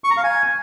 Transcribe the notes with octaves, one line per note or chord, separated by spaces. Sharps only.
C#6
A#5
F5
G#5